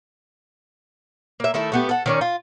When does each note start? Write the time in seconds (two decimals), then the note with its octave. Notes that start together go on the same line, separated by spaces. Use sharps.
1.40 A#3 E5
1.54 D#3 A3 E4 A4
1.72 A3 B3 G4
1.89 A4 F#5
2.06 D#3 C#4 D5
2.21 F4